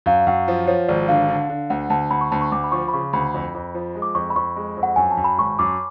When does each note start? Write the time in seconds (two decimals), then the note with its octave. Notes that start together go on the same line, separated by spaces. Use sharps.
0.06 F#2 F5
0.21 F5
0.27 F#2 F#5
0.48 F3
0.67 F3 C#5
0.88 G#1 D5
1.08 D3 F5
1.29 D3
1.50 D3
1.70 D2 F#5
1.90 D2 A5
2.10 D2 B5
2.21 C#6
2.31 D2 A5
2.42 C#6
2.52 D2 D6
2.64 B5
2.72 F3 C#6
2.88 B5
2.93 C#3 C#6
3.13 D2 B5
3.34 F2
3.55 F2
3.74 F3
3.95 G#3
4.02 D6
4.15 F2 C#6
4.30 B5
4.36 F2 C#6
4.56 G#3
4.77 F2
4.83 F#5
4.96 F#2 G#5
5.11 A5
5.17 F#2
5.24 B5
5.38 G#1 C#6
5.59 F#2 D6